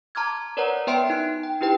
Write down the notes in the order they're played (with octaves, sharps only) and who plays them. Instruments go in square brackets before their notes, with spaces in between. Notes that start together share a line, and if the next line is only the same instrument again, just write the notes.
[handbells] A5 A#5 C6 D6 F6 G#6
A#4 B4 C#5 D5 F#5 A#5
B3 B4 E5 G5 C6 D7
D#4 F#6
G5
D4 E4 G4 B4 G5